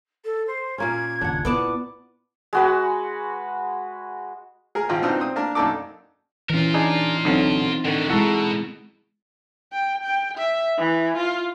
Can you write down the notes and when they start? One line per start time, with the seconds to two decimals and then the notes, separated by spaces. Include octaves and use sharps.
0.24 A4
0.47 C5
0.78 A#2 A#3 C#4 G#6
1.21 F#1 D#2 D4 F#5
1.45 B3 E4 D5 A5
2.53 G#3 F#4 B4
4.75 G#4 A#4
4.89 G#1 F3 F4 D#5 G5
5.02 B2 C4 D4 D#4 F4
5.20 C4 D#6
5.36 A#3 D4 A#4
5.55 F#2 A#3 D4 D#4 A4 D6
6.50 E3 C#4 F4 A#4
6.74 D4 D#4 G#4
7.25 B1 D3 F#3 C4 D#4
7.85 A2 D3 D#3 F#4
8.10 B2 G#3 E4 F#4 A4 A#5
9.73 G5
10.03 G5
10.38 E5
10.78 E3
11.17 F4